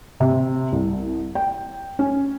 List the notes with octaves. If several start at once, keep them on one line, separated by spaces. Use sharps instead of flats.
C3
C2
G5
C#4